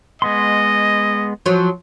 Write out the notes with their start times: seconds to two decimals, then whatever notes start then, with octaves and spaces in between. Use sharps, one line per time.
0.22 G#3 B3 D#5 C6
1.46 F3 F#3